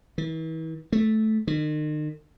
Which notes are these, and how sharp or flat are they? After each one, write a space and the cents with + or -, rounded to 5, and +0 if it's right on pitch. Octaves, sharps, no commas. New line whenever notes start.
E3 -40
A3 -10
D#3 -40